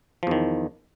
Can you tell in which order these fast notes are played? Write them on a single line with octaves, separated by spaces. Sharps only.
F3 E2 D#3